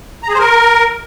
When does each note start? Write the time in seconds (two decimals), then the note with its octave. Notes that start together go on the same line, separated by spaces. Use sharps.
0.23 A#5
0.28 G#4
0.34 C5
0.39 A#4